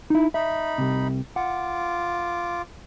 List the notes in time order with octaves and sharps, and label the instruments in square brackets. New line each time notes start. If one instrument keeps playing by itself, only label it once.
[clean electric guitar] D#4 E4
[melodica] D#4 B5 [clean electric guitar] E5
[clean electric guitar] C2 C3
[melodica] F4 D6 [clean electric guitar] F#5